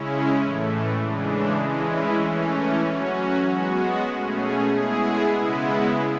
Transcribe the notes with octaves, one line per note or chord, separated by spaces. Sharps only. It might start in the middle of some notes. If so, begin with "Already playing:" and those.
Already playing: C#3 G#3 C#4 E4
A2 E3 A3
C#3 E3 G#3 D4
E3 G#3 C#4 E4
E3 A3 C#4
F#3 C#4 F#4
G#3 B3 F#4
B2 A3 C#4 G#4
G#3 B3 E4 G#4
C#3 G#3 B3 E4